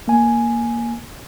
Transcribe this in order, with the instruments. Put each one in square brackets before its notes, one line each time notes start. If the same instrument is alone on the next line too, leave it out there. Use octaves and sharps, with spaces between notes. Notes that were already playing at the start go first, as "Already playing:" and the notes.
[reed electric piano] A#3 G#5